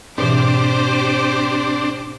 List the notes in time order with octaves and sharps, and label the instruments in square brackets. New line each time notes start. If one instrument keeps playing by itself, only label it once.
[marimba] G#2 B2 E3 [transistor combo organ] C4 D4 [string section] G4 C5 D6